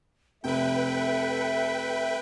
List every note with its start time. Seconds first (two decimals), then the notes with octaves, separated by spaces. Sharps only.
0.44 F1 A4 B4 E5 G5